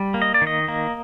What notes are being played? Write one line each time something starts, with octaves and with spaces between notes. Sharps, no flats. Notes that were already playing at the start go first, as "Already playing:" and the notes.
Already playing: G3
A#3
D#5
D5
D#3
D#5
A#3